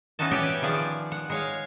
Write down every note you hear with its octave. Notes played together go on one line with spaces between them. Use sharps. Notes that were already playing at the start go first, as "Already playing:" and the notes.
E3 B3 C#4 D#4 F#4 A5
E4 G4 B4 C#5 D5
G5
D#3 F3 G#4 D5
F#5
G#3 C#5 F5